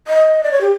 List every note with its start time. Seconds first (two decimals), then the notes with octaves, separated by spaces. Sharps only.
0.07 D#5
0.43 D5
0.51 C#5
0.61 G4